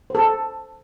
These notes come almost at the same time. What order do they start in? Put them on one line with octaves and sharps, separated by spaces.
C5 A4 A5